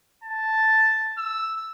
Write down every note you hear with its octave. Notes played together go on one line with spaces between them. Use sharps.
A5
E6